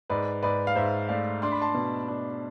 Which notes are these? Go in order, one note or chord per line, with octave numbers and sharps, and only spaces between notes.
G#2 B4 D5
G#2 B4 D5
F5
G#2 C5 E5
A3 D5 F5
D4 C6
B5
A5 C6
B2
D4